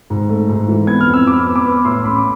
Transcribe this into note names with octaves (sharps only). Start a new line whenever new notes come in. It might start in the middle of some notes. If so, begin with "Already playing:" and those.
G#2
A3
G#2
E3
B3 G#6
F6
F2
E6
F2 B5 D6
B3
B5 D6
B3
A2 C6 E6
A1 B5 D6
D6